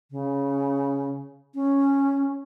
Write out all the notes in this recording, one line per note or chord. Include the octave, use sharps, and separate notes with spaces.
C#3
C#4